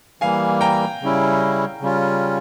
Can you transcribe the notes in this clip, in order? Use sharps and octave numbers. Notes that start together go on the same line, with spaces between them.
E3 G3 A#3 F5 G#5
G5 A#5
C#3 G3 C#4 E4
C#3 G3 C#4 F4